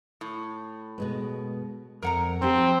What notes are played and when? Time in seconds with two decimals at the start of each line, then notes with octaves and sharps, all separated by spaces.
0.21 A2
0.98 B2 G#3 B3
2.02 F2 A#4 F#5 A#5
2.42 F3 C4 F4 G4